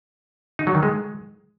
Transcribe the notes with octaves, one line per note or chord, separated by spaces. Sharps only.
D#4
F#3
D#3
G#3